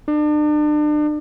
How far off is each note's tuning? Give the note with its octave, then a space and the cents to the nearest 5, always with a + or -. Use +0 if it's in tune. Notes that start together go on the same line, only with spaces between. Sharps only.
D4 +35